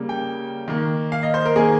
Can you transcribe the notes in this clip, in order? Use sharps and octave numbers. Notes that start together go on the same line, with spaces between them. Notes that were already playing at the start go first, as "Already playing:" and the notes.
Already playing: C#3 G3 A#3
G5
D#3 A#3
F5
D#5
C5
A#4
D#3 A#3 G#4